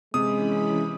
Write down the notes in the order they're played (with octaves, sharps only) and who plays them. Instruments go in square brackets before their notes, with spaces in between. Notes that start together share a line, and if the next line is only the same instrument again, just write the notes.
[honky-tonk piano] C3 [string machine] E3 C#4 B5 [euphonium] G#3 [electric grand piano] D#6